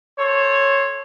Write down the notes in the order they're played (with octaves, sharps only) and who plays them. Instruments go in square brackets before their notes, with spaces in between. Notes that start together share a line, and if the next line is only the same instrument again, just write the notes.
[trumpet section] A4 C5 C#5